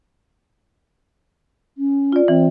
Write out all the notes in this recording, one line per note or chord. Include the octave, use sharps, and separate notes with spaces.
C#4
F4 D5
E3 C4